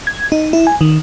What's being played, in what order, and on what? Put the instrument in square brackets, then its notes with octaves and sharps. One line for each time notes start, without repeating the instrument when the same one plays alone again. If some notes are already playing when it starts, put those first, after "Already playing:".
[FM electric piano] G#6
D#4
E4
G#5
D#3